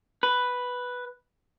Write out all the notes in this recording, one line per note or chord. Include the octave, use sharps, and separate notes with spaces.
B4